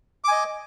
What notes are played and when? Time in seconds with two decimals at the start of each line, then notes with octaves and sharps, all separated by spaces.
0.24 D6
0.28 G#5
0.32 D#5